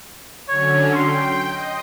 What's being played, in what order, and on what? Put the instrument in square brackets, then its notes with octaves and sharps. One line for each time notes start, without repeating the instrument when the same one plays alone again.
[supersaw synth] D3 F#3 C#4 [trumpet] C#5
[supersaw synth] G5 [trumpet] C6
[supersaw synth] D#5